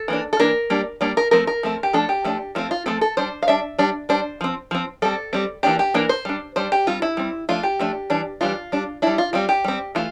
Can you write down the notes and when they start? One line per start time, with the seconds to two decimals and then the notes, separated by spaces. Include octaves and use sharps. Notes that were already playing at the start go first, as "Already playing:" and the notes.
Already playing: A4
0.08 E3 A#3 D4
0.33 A4
0.39 E3 A#3 D4 A#4
0.70 G3 A#3 D4
1.01 G3 A#3 D4
1.17 A#4
1.31 F3 A3 C4 A#4
1.47 A#4
1.63 F3 A3 C4
1.83 G4
1.93 F3 A3 D4 A4
2.09 G4
2.24 F3 A3 D4
2.55 F3 A3 C4 F4
2.71 F4
2.86 F3 A3 C4 A4
3.01 A4
3.17 G3 D4 C5
3.43 F5
3.47 G3 D4 E5
3.79 G3 D4
4.09 G3 D4 C5
4.41 F3 C4
4.71 F3 C4
5.02 G3 C4 A4
5.33 G3 C4
5.63 E3 A#3 D4 G4
5.79 G4
5.94 E3 A#3 D4 A#4
6.09 C5
6.25 G3 D4
6.56 G3 D4 C5
6.72 G4
6.87 G3 C4 F4
7.02 E4
7.17 G3 C4
7.49 F3 A3 D4 F4
7.63 G4
7.79 F3 A3 D4
8.10 E3 G3 D4
8.41 E3 G3 D4 F4
8.72 G3 D4
9.02 G3 D4 E4
9.18 F4
9.33 G3 C4 F4
9.49 G4
9.64 G3 C4
9.95 E3 A3 F4